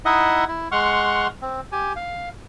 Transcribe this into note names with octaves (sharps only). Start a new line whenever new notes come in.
D#4 E4 D#5 E5 F#5 D#6
E4
G#3 F#5 C6 C#6 F6
C4
G4 G#5
F5